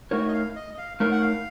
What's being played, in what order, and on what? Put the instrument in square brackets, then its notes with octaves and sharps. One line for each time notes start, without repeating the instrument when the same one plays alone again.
[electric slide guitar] A3 D#4 A#4 C#5 [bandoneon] F#4
[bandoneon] D#5
F5
D#5
D#5
F5
[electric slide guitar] A3 D#4 A#4 C#5 [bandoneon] F5
[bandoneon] F#5
F5